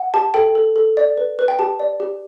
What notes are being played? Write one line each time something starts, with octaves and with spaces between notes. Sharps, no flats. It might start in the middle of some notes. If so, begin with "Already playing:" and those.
Already playing: F#5
G4 A5
A4 G5
A4
A4
D5
B4
B4
G5
G4 A5
D5
G4